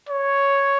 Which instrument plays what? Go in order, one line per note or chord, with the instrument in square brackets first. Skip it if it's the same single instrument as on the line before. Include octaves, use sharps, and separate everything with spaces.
[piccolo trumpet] C#5